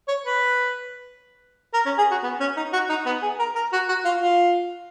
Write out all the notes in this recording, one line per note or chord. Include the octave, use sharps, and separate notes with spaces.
C#5
B4
A#4
C#4
G#4
F#4
B3
C#4
D#4
F#4
D#4
B3
G#4
A#4
A#4
F#4
F#4
F4
F4